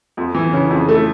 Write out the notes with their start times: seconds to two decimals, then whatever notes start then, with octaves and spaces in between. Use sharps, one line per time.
0.17 F2
0.35 E3
0.53 C#3
0.70 F2
0.89 A3